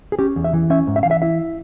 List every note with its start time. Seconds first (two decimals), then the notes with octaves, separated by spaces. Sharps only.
0.12 G#4
0.19 C#4 G4
0.36 E2
0.44 E5
0.53 E3
0.70 C#4 E5
0.87 G#2
0.96 E5
1.03 E3 F5
1.11 E5
1.22 E4 E5